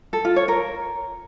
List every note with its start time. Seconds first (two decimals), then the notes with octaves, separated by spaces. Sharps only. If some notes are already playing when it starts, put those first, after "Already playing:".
0.13 A4
0.25 F4
0.36 C#5
0.48 A#4